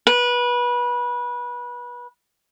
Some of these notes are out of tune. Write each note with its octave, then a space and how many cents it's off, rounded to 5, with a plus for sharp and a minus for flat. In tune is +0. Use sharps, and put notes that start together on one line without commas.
B4 -25